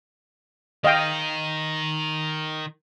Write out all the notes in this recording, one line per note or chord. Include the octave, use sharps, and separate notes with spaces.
D#3 D#4 D#5 F5 G5